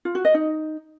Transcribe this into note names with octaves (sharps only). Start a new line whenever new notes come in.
F4
F#4
D#5
D#4